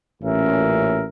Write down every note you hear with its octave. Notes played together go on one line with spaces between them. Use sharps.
A1 A#2 C#4 A#4 E5